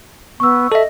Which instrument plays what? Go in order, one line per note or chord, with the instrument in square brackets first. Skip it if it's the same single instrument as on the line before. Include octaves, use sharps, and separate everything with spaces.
[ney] B3 [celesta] C#6 E6
[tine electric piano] A4 E5 [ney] D#5